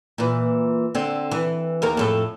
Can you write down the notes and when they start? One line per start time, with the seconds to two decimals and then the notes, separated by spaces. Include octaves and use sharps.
0.18 A#2 E3
0.95 D3 C4
1.31 E3
1.82 D#2 A#3 A#4
1.97 F2 A2 A4